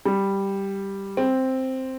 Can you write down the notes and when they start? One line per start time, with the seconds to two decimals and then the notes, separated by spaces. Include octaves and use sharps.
0.06 G3
1.17 C4